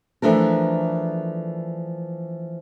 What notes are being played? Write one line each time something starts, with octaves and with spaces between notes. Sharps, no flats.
E3 F3 A3 D4 A#4